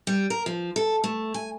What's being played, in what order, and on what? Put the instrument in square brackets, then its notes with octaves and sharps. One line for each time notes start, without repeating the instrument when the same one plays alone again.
[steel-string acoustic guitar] G3
A#4
F3
A4
A3
G#5